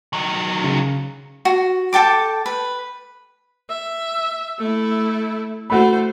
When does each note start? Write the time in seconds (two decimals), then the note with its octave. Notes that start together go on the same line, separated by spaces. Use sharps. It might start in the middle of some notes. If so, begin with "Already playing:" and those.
0.13 D#3 F#3
0.64 C#3
1.45 F#4
1.93 A4 G5 A5 D6
2.46 B4
3.70 E5
4.59 A3 E4
5.70 A3 F#4 C5 B5